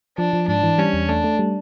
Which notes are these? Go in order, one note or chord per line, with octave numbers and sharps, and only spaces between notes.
F3 D4
F3
G#2 D4
E3
G3 C#4
E2
A3 D4
A3
G3